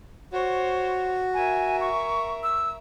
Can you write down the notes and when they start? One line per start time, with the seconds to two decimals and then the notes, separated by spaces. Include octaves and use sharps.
0.33 F#4 C5 C#5
1.34 A#4 E5 G#5
1.81 C#6
2.43 E6